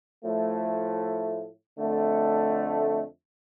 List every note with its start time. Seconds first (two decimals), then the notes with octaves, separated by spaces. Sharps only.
0.24 A2 F3 A3
1.78 F2 D3 A3